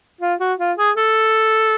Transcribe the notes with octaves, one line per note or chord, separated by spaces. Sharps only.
F4
F#4
F4
G#4
A4